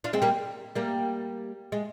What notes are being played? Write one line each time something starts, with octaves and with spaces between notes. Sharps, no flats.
D4 F4
G#3 C4
G3 A#3
G3 A#3
G#3